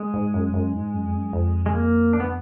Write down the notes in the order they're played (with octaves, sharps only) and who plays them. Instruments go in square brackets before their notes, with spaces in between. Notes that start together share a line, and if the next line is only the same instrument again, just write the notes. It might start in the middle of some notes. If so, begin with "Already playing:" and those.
Already playing: [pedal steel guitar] G#3
[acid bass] G#2
F#2
F#2
G#2
F#2
F2
F#2
F2
[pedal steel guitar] G#3
A#3
D4
B3